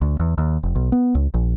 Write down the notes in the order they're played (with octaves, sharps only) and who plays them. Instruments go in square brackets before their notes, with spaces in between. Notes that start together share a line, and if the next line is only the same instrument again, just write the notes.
[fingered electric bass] D2
E2
D#2
F1
B1
B3
C#2
A#1